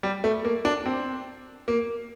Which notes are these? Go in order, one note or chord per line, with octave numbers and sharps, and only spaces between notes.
G3
A3
A#3
D4
C4
A#3